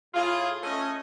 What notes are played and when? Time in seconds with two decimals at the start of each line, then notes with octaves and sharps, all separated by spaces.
0.14 A2 F4 G#4
0.63 A3 C#4 D#5